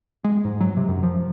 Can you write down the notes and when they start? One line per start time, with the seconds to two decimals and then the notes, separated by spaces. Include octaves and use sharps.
0.24 G#3
0.45 G#2
0.60 F#3
0.77 C3
0.88 F#2
1.03 F3